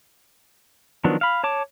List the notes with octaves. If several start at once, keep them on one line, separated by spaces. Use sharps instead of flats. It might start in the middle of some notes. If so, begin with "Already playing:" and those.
D#3 F3 F#3 B3 D4
F5 B5
C#5 A5 D6